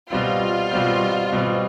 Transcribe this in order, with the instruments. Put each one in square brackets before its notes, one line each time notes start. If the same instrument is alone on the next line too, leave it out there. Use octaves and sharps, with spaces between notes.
[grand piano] B2 G3 C4 [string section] F4
[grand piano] B2 G3 C4
B2 G3 C4